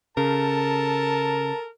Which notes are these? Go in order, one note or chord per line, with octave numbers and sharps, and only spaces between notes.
C#3 A4 A#4 A5